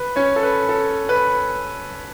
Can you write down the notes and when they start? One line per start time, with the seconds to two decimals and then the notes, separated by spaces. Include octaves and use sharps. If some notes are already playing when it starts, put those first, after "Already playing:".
Already playing: B4
0.16 C#4 C#5
0.36 A4
0.43 B4
0.69 A4
1.09 B4